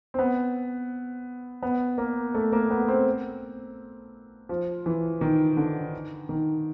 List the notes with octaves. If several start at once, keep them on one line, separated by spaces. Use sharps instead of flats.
C4
B3
B3
A#3
A3
A#3
B3
C4
F3
E3
D#3
D3
D#3